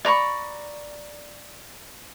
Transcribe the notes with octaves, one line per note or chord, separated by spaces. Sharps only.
D5 A#5 B5 C#6